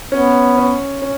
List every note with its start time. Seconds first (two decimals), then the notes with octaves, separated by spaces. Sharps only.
0.11 B3 C#4
0.57 C#4
1.02 C#4